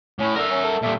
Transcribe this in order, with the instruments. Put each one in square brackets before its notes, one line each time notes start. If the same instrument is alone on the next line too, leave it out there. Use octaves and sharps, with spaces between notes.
[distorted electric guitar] A2 [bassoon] C#4
[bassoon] D3 [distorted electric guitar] A#4 E5
[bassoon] C#4
A4
[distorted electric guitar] A#2 G3 [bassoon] A3